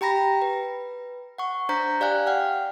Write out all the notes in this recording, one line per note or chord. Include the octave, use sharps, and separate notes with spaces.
G4 G5 A#5 B5 A#6
B4
F#5 C#6
D4 C5 A#5 G6 B6
G4 D5 F5 G#5 F#6
F#5 G5 F6